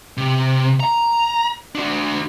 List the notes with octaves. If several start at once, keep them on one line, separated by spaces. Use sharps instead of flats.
C3
A#5
D4 F#4